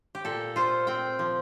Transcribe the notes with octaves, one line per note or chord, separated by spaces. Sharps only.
G4
A#2 A4
F4 C5
C4 G5
F3